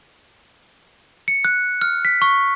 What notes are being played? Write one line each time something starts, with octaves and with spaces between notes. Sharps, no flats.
C#7
F#6
F6
B6
C#6